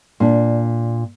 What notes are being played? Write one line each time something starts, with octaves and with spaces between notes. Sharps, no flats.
A#2 D4